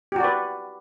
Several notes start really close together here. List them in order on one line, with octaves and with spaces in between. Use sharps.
G4 F#4 D5 B4